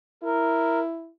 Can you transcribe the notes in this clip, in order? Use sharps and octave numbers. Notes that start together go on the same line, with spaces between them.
E4 A#4